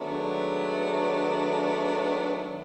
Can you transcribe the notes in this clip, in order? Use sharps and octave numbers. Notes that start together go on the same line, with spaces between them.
D#3 F#3 G#3 A3 B3 D4